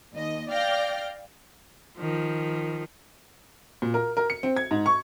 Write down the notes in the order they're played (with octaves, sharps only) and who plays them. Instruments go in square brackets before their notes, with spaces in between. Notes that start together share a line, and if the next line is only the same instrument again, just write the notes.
[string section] D#2 D#5
D5 F5 G5 F6 G6 A#6
[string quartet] D#3 F3
[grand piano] A#2
A#4
A#4
C#7
C4
G#6
G#2
C#6